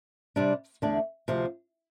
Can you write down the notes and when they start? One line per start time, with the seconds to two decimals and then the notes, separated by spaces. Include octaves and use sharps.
0.36 C3 G3 D4
0.82 E2 D3 A3 D4
1.28 D2 C3 F3